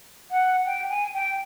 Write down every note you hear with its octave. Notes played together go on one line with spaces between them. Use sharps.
F#5
G5
G#5
G5